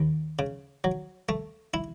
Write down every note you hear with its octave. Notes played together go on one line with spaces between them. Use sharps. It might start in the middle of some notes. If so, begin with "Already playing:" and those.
Already playing: D#2
C#3
F#3
A3
E4